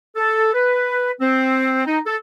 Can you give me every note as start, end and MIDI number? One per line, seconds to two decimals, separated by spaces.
0.16 0.53 69
0.54 1.12 71
1.21 1.84 60
1.87 1.99 63
2.07 2.16 69